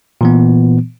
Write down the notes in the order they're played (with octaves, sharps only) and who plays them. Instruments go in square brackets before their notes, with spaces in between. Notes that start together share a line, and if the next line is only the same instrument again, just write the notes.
[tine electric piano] A#2 E3 B3